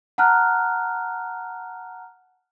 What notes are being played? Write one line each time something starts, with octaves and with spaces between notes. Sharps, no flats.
F#5 A5 A#5 F6 F#6